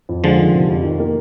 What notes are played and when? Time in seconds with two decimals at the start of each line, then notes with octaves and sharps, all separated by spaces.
0.09 F2
0.24 D3 F3 G#3
0.39 D#3
0.54 C3
0.69 F2
0.85 D#3
1.00 A#3